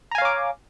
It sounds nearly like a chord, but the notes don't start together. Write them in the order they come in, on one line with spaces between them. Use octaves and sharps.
A#5 G#5 F5 C#5 D6